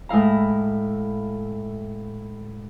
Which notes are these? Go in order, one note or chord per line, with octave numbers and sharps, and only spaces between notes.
A2 G#3 E4 F5 A#5